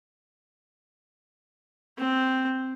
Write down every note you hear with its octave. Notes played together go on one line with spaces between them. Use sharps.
C4